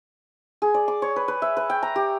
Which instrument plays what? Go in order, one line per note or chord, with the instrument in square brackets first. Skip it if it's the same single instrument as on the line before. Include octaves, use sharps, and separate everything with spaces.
[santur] G#4
D5
D6
C#5
B4
B4
E5
B4
G5
A#5
G4